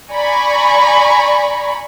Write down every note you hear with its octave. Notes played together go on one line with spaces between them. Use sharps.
D5 G#5 A#5 B5 C#6